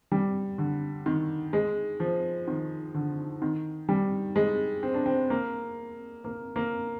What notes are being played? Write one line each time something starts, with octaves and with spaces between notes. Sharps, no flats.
G3
D3
D#3
G#3
F3
D#3
D3
D#3
G3
G#3
C4
D4
C4
A#3
A#3
A#3